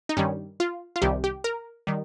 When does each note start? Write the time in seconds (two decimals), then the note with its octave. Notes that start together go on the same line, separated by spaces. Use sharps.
0.09 D#4
0.17 G2 D#3 G3 C#4
0.60 F4
0.96 F4
1.02 C2 C3 D#3 G3 G4
1.24 G4
1.44 A#4
1.87 D#3 G3